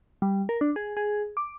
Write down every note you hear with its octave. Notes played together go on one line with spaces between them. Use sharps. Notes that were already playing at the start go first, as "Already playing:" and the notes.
G3
A#4
D4
G#4
G#4
D6